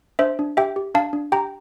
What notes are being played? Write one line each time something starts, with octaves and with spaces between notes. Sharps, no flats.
D4 C5 E5
D4
G4 E5 G5
G4
D4 F5 A5
D4
G4 G5 A#5